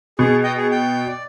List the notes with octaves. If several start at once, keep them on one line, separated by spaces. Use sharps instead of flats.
B2 G#4
D#5 G5
G#4
G5
D5